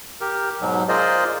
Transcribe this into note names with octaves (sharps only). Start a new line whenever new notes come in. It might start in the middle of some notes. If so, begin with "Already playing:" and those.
G4 A#4
G#2 B2 F#3
F4 G#4 A#4 C5 D5 D#5